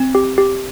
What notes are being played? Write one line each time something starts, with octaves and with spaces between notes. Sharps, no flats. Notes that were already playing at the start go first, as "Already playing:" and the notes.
Already playing: C4
G4
G4